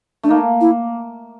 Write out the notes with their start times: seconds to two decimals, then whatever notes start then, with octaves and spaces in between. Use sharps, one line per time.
0.23 A3 D4
0.29 A#3 D#4
0.61 E4